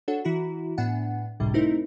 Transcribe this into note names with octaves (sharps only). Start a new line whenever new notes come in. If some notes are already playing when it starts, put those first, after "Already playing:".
D4 F#4 A4 C#5 F#5
E3 E4 F#4 A#5
A2 B3 D4 F#5 G#5
G1 C#2 A2 C3 G3
A3 C4 D#4 E4 A#4 C5